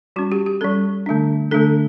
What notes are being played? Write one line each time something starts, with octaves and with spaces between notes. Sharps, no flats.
G3 C#4 F#4
G4
G4
G3 C#4 A4
D3 A3 D4
D3 A3 D4 A4